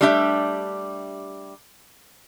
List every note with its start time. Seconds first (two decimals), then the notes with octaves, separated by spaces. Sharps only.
0.01 G3 A3 D4 G4 E5